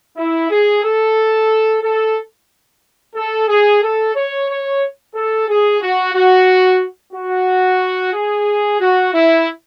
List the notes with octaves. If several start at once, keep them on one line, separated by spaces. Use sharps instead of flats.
E4
G#4
A4
A4
A4
G#4
A4
C#5
C#5
A4
G#4
F#4
F#4
F#4
G#4
F#4
E4